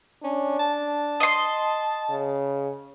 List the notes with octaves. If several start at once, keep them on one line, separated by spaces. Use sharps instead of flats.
C#4 D4
A5
D#5 C6
C#3